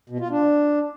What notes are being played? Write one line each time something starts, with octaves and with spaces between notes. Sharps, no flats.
B2
F4
D4